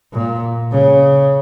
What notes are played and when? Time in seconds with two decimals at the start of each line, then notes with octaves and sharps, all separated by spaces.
0.12 A#2
0.71 C#3